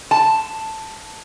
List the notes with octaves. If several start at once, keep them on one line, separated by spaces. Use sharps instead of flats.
A5